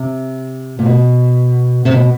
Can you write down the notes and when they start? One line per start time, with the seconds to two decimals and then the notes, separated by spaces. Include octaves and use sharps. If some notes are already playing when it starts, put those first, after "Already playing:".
Already playing: C3
0.79 A#2
0.86 B2
1.85 C3
1.92 B2